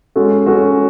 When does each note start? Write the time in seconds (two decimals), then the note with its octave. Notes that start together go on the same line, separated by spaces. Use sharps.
0.16 G#3 C#4 F#4 A4
0.46 G#3 C#4 F#4 A4